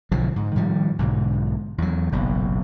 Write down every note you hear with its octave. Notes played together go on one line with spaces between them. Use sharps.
B1 D3 F3 F#3
G#2
A2 D#3 F3 G3
B1 G#2 D3
E2 F#3
F#1 B1 A#2